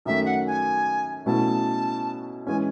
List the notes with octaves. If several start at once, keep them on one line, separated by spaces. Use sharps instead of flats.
F#2 D#3 A3 C#4 E5
F#5
G#5
B2 F#3 A3 C#4 E4 A5
E3 G#3 C#4 G#5